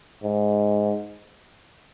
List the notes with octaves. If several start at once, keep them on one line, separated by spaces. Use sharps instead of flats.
G#2